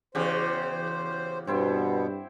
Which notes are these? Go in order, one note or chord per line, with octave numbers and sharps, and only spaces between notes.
E2 C#3 C#4 F#4 G4 C5
G2 B2 B3 C4 E4 C5